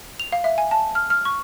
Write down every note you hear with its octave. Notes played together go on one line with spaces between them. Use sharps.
F7
F5
E5
G#5
A5
F6
F6
C#6